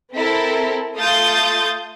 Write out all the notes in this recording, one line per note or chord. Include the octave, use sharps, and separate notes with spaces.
C4 E4 A4 A#4
A3 F4 F5 D#6 G6 A6